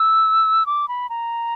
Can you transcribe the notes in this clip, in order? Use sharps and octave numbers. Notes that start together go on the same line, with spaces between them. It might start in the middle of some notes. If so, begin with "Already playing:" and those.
Already playing: E6
D6
B5
A#5